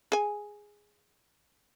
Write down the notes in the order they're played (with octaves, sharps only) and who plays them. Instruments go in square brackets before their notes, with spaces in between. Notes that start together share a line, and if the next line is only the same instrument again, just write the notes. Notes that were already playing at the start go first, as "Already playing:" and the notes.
[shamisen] G#4 G#5